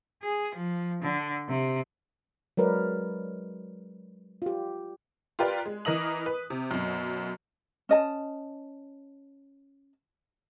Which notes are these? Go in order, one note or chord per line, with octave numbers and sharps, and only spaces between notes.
G#4
F3
D3
C3
F#3 G#3 A#4 B4 D5
F4 G4
F4 G4 A#4 B4 D5
G#3
E3 A#4 D#5 D#6 F#7
B4
C3
F#2 B2
C#4 D#5 A5